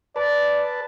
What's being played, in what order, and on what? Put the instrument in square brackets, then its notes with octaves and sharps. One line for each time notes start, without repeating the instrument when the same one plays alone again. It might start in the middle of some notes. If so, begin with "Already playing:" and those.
[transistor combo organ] B4 A5 [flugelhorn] D5